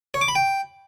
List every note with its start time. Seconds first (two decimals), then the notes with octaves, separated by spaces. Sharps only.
0.14 C#5
0.21 D6
0.28 B5
0.35 G5